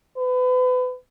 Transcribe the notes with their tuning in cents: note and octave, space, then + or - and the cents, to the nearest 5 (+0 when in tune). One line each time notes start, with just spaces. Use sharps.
B4 +30